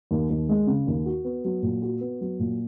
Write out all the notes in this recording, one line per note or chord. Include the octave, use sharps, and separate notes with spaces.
D#2
D#2
G#3
C#3
D#2
F#4
B3
F#3
A#2
F#4
B3
F#3
A#2